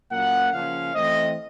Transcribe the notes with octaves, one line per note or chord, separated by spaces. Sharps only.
A#2 F#3 A#3 C#4 F#5
C#3 F3 A#3 C#4 F5
E3 A3 C4 D#5